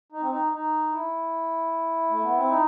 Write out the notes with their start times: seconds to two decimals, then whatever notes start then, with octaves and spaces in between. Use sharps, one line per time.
0.12 D#4
0.21 C4
0.30 D#4
0.52 D#4
0.92 E4
2.10 A3
2.23 B3
2.36 C4
2.49 D#4